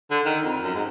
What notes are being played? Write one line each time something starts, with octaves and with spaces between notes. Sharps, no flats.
D3
D#3
F2
F#2
G#2